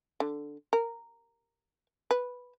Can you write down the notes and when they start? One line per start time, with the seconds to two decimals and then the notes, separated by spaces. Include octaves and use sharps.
0.20 D3
0.73 A#4
2.11 B4